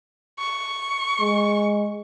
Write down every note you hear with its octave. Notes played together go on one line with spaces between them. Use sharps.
C#6
G#3